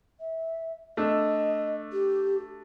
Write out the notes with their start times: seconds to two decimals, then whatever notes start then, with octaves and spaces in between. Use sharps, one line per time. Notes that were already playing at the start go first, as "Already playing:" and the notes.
0.20 E5
0.97 A3 D4 D#5 E6
1.92 G4